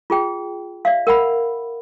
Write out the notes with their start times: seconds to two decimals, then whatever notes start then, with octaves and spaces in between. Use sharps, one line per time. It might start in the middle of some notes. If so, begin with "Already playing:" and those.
0.10 F4 G#4 G5
0.85 D5 E5 F5
1.07 A#4 F#5 B5